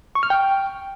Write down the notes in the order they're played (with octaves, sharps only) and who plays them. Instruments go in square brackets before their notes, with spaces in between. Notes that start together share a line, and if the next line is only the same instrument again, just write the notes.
[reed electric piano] C#6
F6
G5